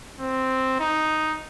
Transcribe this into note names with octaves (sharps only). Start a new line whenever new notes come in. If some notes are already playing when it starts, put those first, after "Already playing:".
C4
D#4